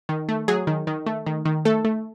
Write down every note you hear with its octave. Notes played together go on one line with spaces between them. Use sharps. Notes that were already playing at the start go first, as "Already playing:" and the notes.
D#3
A3
F#3 G#4
D#3
D#3
A3
D#3
D#3
A3 A4
A3